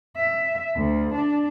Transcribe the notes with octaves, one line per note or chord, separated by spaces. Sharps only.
E5
D2
D4